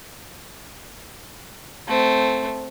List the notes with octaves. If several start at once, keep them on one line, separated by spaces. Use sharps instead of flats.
A3 C4